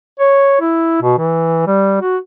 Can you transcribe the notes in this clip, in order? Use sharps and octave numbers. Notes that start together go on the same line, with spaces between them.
C#5
E4
B2
E3
G3
F#4